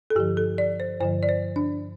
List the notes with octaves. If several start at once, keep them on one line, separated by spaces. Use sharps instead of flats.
A4
G2 D3 F3 G4
A4
D5
C5
G2 D3 F3 C5
D5
C5
D4